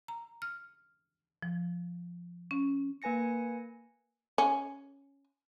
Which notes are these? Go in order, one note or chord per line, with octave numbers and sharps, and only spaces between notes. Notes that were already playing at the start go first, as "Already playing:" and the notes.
A#5
F6
F3
C#4
A#3 B4 G#5 A#6 C#7
C#4